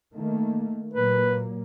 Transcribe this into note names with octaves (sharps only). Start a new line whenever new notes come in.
D#3 A3 A#3
A#2 F#3 A#3 B4